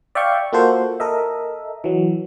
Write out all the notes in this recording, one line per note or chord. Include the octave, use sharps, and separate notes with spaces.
D5 E5 F5 G5 C#6
A#3 F4 F#4 A4 C5
A4 A#4 D#5 E5
E3 F#3